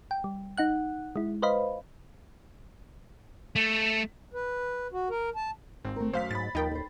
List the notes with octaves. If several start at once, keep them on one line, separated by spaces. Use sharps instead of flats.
G5
G3
D#4 F#5 F#6
G#3 E4
B4 C5 D#5 F5 B5
A3
B4
F#4
A#4
A5
G#1 C4
A3 A#4
F#2 F#3 C5 F5 B6
G#2 B5 A6
D#2 F3 D#4 A#4 G5
A4 C5